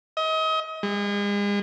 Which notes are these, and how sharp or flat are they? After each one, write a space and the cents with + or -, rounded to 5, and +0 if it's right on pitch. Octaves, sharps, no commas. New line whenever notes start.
D#5 +35
G#3 -40